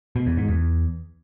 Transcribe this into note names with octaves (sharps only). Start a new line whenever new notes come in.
B2
E2
G#2
E2